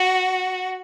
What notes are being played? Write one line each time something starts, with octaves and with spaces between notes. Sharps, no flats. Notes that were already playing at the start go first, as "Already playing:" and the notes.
Already playing: F#4